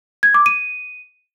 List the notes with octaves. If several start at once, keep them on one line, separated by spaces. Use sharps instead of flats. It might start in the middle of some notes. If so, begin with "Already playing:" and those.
G#6
D6
D#7